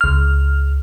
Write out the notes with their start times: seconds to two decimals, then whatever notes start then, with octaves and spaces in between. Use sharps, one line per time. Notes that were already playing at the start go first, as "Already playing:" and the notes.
0.01 C#2 F6